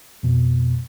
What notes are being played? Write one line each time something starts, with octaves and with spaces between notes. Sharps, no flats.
F2 B2